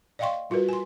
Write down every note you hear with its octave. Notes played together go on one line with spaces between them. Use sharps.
D5 D#5 F5 G5 C6 C#6
G3 F4 F#4 A#4 B4
G#5 C6